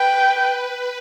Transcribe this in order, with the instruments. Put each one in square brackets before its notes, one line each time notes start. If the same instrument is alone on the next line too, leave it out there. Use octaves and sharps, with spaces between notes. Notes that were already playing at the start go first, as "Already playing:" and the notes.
Already playing: [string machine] B4 [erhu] G5